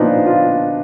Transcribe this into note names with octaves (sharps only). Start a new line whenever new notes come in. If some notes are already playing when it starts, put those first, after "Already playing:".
Already playing: A#2 F3 B3 D4 D#4
F4